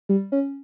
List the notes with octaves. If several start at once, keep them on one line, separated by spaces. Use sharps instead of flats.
G3
C#4